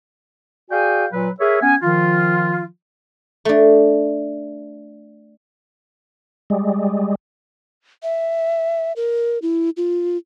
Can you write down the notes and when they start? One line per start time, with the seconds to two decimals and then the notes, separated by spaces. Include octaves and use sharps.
0.71 F#4 G#4 D5 F5 G5 G#5
1.12 A#2 F#3 B4
1.40 G#4 A#4 C#5 E5
1.62 B3 C#4 G#5
1.83 D#3 F3 F4
3.45 A3 D4
6.50 G3 G#3
8.03 E5
8.96 A#4
9.42 E4
9.77 F4